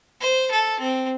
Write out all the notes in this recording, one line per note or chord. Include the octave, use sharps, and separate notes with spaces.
C5
A4
C4